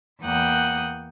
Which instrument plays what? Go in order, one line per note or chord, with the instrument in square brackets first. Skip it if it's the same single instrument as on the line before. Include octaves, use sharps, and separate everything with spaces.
[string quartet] E2 A#3 F#5 G5 D#6 F#6